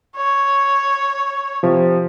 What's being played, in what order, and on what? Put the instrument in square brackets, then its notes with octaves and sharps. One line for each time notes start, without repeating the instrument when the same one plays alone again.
[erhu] C#5
[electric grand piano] C3 F3